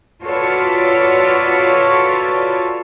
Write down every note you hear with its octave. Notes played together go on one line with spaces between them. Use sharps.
F4 F#4 A4 B4 C#5 D5